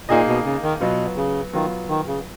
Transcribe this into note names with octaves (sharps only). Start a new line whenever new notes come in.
A#2 A#3 D#4 G#4 D#5
B2
C#3
D#3
B2 F#3 B3 F4
C#3
D#3 F#3 B3 F4
D#3
C#3